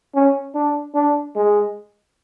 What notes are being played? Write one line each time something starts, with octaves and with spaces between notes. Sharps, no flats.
C#4
D4
D4
G#3